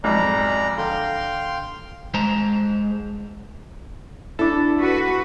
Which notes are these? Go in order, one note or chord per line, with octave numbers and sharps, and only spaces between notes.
B1 F2 G#2 D5 A#5
D3 F5 G5 C6
G#3 C5 A5 A#5
D4 E4 A4
F#4 B4